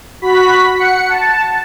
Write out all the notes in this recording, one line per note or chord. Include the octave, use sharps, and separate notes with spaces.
F#4 B5 B6
F#5 C#7
A5